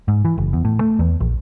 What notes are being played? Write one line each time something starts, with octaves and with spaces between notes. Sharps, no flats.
G#2
E3
F#1
E2
A2
A3
E2
A#1